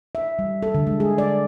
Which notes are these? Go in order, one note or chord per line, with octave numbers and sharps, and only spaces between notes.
E5
G3
A4
D3
G#3
G#4
D5